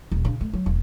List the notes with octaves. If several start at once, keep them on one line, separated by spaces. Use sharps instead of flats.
D#1
C#3 D4
A3
F#3
E1